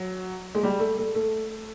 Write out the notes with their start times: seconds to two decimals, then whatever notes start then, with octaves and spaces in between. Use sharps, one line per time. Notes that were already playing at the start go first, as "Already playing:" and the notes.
Already playing: F#3
0.55 G#3
0.63 G3
0.80 A3
0.98 A3
1.15 A3